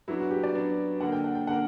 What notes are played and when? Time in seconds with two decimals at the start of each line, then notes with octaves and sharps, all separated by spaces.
0.08 F#3 B3 D4 E4
0.20 F#4
0.31 G4
0.43 D5
0.55 F#3 B3 D4
1.00 D3 A#3 D4 A#4 F#5
1.12 G5
1.24 F#5
1.35 G5
1.47 D3 A#3 D4 A#4 F#5